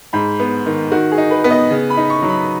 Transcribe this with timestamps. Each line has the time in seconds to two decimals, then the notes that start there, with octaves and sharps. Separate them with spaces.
0.13 G#2 B5
0.40 B3
0.66 D#3
0.91 D#3 F#4
1.11 G#4
1.18 D#4
1.31 B4
1.44 B3
1.50 D#5
1.70 C#3
1.90 B5
1.97 D#4
2.10 C#6
2.22 F#3
2.29 B5